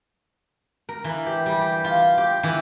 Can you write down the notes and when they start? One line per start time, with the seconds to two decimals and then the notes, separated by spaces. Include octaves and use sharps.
0.89 A#4
1.04 E3
1.26 G4
1.46 G3
1.61 G4
1.84 F4
2.18 G4
2.43 E3